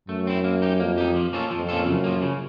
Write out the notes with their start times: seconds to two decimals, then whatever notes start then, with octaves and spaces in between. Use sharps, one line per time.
0.09 F#2 A3
0.27 C4 E4
0.44 A#3
0.62 D#4 G4
0.80 F2 A#3
0.98 D#4 G4
1.16 F3
1.33 A#3 C#4 F4 A4
1.50 F2 F3
1.69 A#3 C#4 F4 A4
1.86 F#2 C#3
2.04 F3 A#3
2.22 C#3